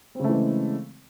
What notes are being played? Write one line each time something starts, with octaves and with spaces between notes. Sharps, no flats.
C#3 E3 G#3 A3 C4